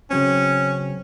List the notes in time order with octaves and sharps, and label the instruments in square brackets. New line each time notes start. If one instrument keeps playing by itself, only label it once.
[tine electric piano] C#3 F#3 C4 [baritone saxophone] C#4